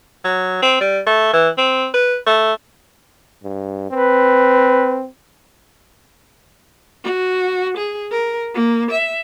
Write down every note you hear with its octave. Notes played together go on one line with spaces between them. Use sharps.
F#3
C4
G3
A3
E3
C4
B4
A3
G2
C4 B4
F#4
G#4
A#4
A#3
E5